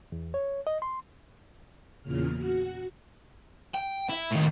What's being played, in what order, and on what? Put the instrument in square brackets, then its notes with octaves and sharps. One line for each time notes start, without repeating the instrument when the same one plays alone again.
[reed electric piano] E2
C#5
D#5
C6
[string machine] E2 A#2 C#3 F6
F#4
[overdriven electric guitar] G5
E4
A2 D#3